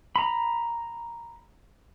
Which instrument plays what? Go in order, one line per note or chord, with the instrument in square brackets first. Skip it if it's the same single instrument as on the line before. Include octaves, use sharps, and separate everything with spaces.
[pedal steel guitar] A#5 B5